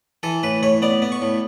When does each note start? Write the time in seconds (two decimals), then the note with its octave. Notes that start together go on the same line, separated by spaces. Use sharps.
0.23 E3 A4
0.43 A2 B4
0.63 A2 C#5
0.82 B3 D5
1.02 B3
1.12 C#6
1.22 A2